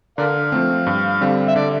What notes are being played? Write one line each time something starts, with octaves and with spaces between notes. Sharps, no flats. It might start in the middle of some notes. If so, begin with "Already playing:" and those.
D3 A#4 D5 F5
F3 A3 C4
G2
D3 G3 C4
E5
D3 D5